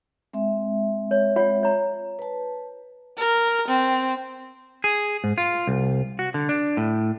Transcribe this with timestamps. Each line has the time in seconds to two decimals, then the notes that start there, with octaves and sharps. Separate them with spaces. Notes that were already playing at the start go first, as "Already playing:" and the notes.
0.33 G#3 C4 E5
1.11 C#5
1.36 F4 C#5 F#5
1.63 C#5 A#5
2.19 B4 A5
3.18 A#4
3.68 C4
4.84 G#4
5.24 G#2
5.38 F4
5.67 C2
6.19 F#4
6.34 D3
6.49 D4
6.77 A2